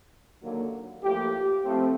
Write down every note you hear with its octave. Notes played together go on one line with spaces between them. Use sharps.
D#2 D3 F#3 A#3
A2 F3 A#3 G4
A2 F3 A3 C4